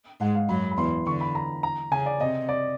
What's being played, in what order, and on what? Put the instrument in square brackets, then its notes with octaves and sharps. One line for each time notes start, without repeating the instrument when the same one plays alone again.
[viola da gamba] G#2 G#3 [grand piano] F#5
[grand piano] F5
[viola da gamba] F#2 F#3 [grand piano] B5
[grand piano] B5
[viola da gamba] E2 E3 [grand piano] C6
[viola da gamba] D3 [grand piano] C#6
[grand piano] B5
A#5
A#5
[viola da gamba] C#3 [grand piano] G#5
[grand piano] D5
[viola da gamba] C3 [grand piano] D#5
[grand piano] D5